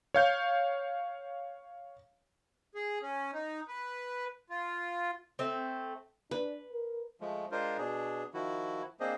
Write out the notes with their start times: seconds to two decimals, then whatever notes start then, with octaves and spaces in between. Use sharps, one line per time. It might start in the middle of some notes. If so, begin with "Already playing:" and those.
0.14 C#5 F5 G6
2.75 G#4
3.02 C#4
3.33 D#4
3.68 B4
4.50 F4
5.39 A3 C4
6.31 D4 B4
6.72 A#4
7.21 F3 G#3 A3
7.52 G#3 D4 F4 A#4 C5
7.79 B2 D4 G#4
8.34 D#3 F3 E4 F#4
9.00 A#3 C4 D4 G#4 C5 D#5